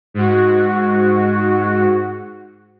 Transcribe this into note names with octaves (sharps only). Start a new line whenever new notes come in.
G#2 F#4